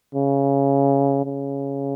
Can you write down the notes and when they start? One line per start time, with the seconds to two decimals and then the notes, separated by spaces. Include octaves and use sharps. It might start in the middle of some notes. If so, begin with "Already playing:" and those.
0.15 C#3
1.25 C#3